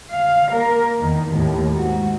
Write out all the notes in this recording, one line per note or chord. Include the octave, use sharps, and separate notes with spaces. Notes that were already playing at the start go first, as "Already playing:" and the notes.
F5
A#3 A#4
E2 D#3
D#2 A2
G#2 F#4